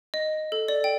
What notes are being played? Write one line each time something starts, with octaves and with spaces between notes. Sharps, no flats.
D#5
A4
D5
G5